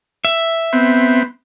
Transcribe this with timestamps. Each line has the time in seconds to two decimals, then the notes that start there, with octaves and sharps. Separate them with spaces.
0.25 E5
0.73 B3 C4